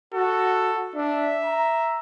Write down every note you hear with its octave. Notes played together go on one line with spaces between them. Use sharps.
F#4 A4
D4 E5
A#5